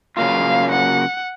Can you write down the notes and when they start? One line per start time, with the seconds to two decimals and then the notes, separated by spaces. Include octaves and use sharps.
0.17 C#3 F#3 A#3 F4 F5
0.71 F#5